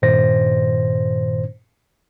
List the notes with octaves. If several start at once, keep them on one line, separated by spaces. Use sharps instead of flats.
G2 A#2 D#3 C5 A#6